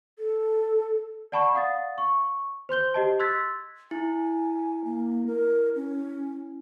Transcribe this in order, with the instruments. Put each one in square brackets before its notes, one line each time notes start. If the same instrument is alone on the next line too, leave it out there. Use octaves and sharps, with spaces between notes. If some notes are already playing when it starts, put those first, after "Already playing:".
[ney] A4
[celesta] D5 F#5 A5 B5 C#6
D5 F5 F#5 D#6 A6
C#6
C5 C6 G6 G7
G4 D#5 A5
C6 E6 F#6 G#6 A6 B6
[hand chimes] E4 [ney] G#5
[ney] A#3
A#4
C#4